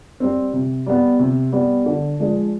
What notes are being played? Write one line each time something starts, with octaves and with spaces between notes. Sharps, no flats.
G3 C4
C3
G3 B3
C3
G3 B3
D3
F3 G#3 D4 G#4